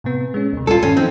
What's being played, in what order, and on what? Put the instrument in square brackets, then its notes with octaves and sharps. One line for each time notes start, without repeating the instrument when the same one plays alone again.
[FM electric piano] A2 C3 B3
G#3 C#4
D2 C3
[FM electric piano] A#2 G3 [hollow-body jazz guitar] F4 A4
[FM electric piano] G2 D#3 [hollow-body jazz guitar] C#4
[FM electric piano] E3 F3 D#4 [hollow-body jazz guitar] C4